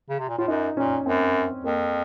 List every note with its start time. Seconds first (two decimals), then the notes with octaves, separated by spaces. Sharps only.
0.10 C#3
0.19 C3
0.29 A#2
0.38 A2 F4
0.48 F#2 D#4
0.77 A#2 C#4
1.06 F#2 C4
1.64 F2 A#3